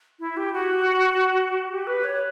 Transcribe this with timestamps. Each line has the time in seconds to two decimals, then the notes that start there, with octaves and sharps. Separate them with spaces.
0.20 E4
0.37 G4
0.53 F#4
1.70 G4
1.87 B4
2.04 C#5